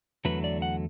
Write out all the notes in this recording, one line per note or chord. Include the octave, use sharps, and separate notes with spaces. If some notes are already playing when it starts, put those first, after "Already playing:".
E2 D3 F#3 A3 B4
D5
F#5